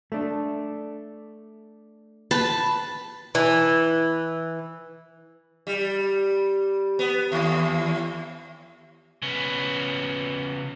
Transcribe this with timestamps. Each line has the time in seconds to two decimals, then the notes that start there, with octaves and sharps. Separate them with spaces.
0.12 A3 D4
2.31 B4 A5
3.35 E3
5.67 G3
6.99 B3
7.32 D#2
9.22 C#3 B3